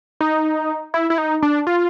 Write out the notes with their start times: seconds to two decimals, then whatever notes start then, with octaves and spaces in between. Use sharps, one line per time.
0.21 D#4
0.94 E4
1.10 E4
1.18 D#4
1.42 D4
1.67 F4